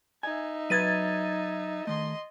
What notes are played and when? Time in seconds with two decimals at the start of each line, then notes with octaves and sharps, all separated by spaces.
0.23 D#4 E5 G#5
0.70 F#3 B4 D#5 G#6 A6 D#7
1.87 D#3 A3 D#5 C6